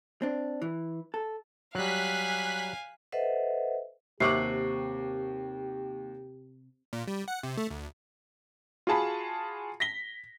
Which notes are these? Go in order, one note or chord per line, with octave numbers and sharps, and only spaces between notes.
C4 D4
E3
A4
F#3 G3 F5 G#5 F#6 B6
A4 B4 C5 D#5 E5 F#5
D#2 C3 G4 F#5 C#6 D6 C7 F#7
A#2
G3
F#5
C3
A3
D2
F4 F#4 G#4 A5 B5
A#6 B6 G7